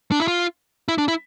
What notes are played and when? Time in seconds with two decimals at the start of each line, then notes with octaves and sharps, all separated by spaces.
0.12 D4
0.20 E4
0.28 F4
0.88 E4
0.98 D4
1.08 E4